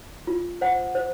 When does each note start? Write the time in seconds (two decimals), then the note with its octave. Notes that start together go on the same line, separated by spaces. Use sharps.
0.27 F4
0.61 C5 F#5
0.95 C5